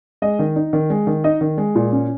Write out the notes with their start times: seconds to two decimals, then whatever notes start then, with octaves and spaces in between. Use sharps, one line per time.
0.22 G#3 D#5
0.39 D#3
0.56 D#4
0.73 D#3
0.90 G#3
1.07 D#3
1.24 D#4 D#5
1.41 D#3
1.58 G#3
1.75 A#2
1.92 C#4